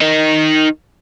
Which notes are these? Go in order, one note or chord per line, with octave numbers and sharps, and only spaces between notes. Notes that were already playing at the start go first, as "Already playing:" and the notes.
D#3 D#4